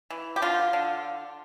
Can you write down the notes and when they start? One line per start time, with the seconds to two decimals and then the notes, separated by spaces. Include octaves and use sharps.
0.10 E3
0.36 G4
0.42 D3 F4
0.73 D3